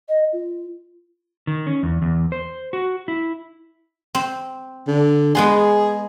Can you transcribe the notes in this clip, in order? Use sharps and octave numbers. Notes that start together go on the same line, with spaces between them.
D#5
F4
D#3
C#4
E2
E2
C5
F#4
E4
C4
D3
G#3 B3 G#4 C6